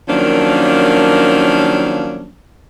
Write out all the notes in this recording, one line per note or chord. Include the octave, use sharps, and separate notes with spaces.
D#3 F3 F#3 A#3 C#4 D4